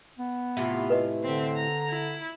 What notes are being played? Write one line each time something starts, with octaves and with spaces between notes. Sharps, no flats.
B3
A2 C3 E3 F4
B4 D#5
D3 C4 E5
A#5
E4